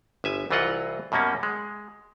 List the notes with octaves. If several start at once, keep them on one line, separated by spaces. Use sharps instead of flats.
G1 E5 G#5
C2 E3 F#3 F4 D#5 F#5
F#2 B2 G3 A#3 C#4
G#3